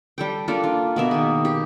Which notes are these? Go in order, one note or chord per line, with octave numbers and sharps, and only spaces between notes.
G3 A4 G5
A#3 D4 F4 A4
F4
B2 A#3 E5
D#3 G#4
G4